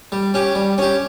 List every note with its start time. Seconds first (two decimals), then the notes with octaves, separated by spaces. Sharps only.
0.12 G3
0.34 C#4 G4
0.55 G3
0.78 C#4 G4